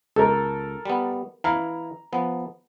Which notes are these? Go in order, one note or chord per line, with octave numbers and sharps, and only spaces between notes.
C#2 A4 A#4
G3 B3
E3 E4 F5 A#5
F3 B3